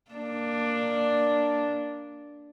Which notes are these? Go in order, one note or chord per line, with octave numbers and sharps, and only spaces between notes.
A#3 D4